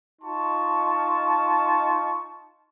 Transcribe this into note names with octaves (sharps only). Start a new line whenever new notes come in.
D#4 F4 A5 C6 C#6